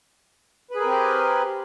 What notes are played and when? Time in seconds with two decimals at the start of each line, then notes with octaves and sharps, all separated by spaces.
0.71 B4
0.76 G#4
0.80 A#4
0.85 C4
0.89 G4